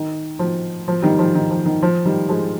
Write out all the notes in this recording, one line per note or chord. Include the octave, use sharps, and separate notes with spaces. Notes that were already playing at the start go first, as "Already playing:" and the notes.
Already playing: D#3
F3
F3
D#3 G3
F3
D#3
F3
D#3
F3
D#3 G3
F3 G#3